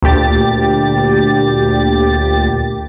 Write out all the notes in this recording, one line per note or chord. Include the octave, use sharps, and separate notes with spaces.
D2 A#2 G4 A6